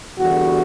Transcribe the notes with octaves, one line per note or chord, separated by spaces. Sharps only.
E2 D3 G3 F#4